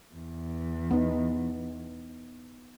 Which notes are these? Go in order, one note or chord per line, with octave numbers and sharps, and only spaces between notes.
E2
B3 D#4